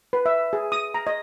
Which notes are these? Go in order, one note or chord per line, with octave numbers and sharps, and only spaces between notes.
B4
E5
G#4
D#6
A#5
D#5